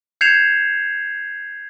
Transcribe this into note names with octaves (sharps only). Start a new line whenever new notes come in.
G6 G#6 C7 C#7 E7 F7